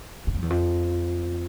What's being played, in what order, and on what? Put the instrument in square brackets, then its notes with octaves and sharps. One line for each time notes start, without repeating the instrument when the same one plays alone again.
[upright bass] G2
F2
E2
F2